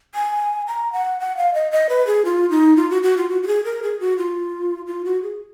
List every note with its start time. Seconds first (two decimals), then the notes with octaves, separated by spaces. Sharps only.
0.15 G#5
0.67 A#5
0.93 F#5
1.20 F#5
1.37 F5
1.54 D#5
1.71 D#5
1.89 B4
2.07 G#4
2.25 F4
2.50 D#4
2.77 F4
2.90 F#4
3.03 F#4
3.17 F4
3.29 F#4
3.43 F#4
3.47 G#4
3.65 A#4
3.83 G#4
4.00 F#4
4.18 F4
4.87 F4
5.05 F#4
5.23 G#4